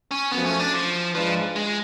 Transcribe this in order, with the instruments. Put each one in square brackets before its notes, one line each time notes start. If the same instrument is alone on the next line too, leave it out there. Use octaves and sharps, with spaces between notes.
[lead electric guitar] C#4
[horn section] F#2 F3 A3 [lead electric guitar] B3
[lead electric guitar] C#4
D4
F3
[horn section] G#2 G#3 D4 F4 B4 [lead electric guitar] F3
[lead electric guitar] G#3